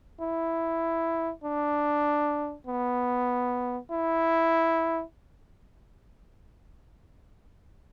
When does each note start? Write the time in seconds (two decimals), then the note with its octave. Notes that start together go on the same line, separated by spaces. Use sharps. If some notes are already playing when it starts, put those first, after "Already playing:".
0.21 E4
1.44 D4
2.67 B3
3.91 E4